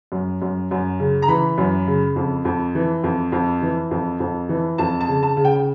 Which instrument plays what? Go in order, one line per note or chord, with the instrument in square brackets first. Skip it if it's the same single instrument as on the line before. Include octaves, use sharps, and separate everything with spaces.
[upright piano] F#2
F#2
F#2
C#3
A#5
E3 B5
F#2
C#3
F2
F2
E3
F2
F2
E3
F2
F2
E3
F2 A5
A5
C#3
A5
C#3
G5
G5